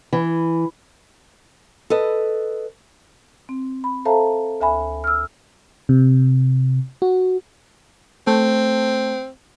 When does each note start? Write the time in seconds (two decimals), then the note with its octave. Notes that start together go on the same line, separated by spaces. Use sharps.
0.13 E3
1.90 A4 B4 D#5
3.49 C4
3.84 B5
4.05 A4 C5 E5 F5 A5 A#5
4.61 D2 E5 G#5 B5
5.04 E6 F6
5.89 C3
7.02 F#4
8.27 A3 C4